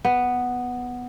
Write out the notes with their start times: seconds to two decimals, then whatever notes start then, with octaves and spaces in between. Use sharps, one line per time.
0.05 B3